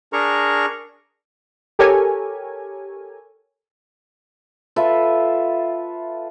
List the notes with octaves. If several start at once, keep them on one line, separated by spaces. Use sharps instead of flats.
D4 G#4 A#4 A#5 C#6
G4 A4 A#4 C#5 G#5
F4 A4 B4 E5